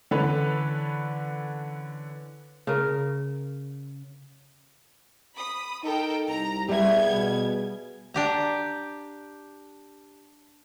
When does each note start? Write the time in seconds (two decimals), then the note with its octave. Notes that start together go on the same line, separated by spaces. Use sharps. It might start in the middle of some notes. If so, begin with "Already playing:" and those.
0.11 D3 E3 C#4 A4 B4 C#5
2.67 C#3 A#4
5.37 B5 D#6
5.84 D#4 A4 A#4 G5
6.29 C2 A#5
6.68 G3 B3 G4 G#4 E5 G#6
7.14 B2
8.14 D4 G4 A#5